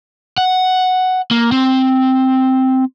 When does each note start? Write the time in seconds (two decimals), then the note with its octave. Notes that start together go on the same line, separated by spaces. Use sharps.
0.38 F#5
1.31 A#3
1.52 C4